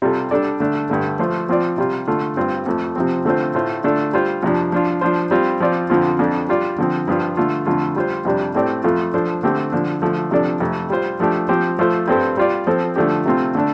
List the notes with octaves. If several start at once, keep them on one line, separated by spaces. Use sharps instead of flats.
C3 G3 F4 A4
G3 D4 A4 D5
D3 A3 D4
G2 D3 A3
F3 A3 F4 C5
F3 C4 F4 D5
C3 G3 F4
D3 A3 F4
G2 G3 C4 F4
F2 F3 A3
C3 F3 C4
D3 A3 C4 F4 C5
A2 A3 F4 C5
D3 A3 D4 F4 A4
G3 F4 C5
F2 C3 F3 D4
F3 D4 F4
F3 D4 F4 C5
G3 C4 F4
F3 C4 F4 D5
F2 D3 F3 C4 F4
F2 F3 D4 A4
G3 F4 D5
D3 F3 C4
G2 F3 D4 F4
D3 A3 F4
F2 D3 A3 F4
G3 F4 C5
F2 C3 G3 D4
A2 A3 C4 G4 D5
F2 F3 A3 F4 A4
F3 D4 A4 C5
D3 A3 C4 G4
D3 F3 D4
D3 F3 A3
C3 F3 D4 A4 D5
F2 C3 A3
G3 F4 C5
F3 A3 D4 G4
F3 C4 G4 C5
F3 A3 F4 A4 C5
G2 G3 C4 A4 C5
G3 F4 D5
F3 C4 A4 C5
D3 F3 A3 D4 G4
C3 A3 C4 F4
D3 A3 D4